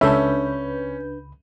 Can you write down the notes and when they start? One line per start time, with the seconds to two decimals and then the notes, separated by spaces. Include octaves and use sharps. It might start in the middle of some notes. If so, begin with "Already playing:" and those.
0.01 C#2 C#4 D4 A4 B4 E5 B5 G6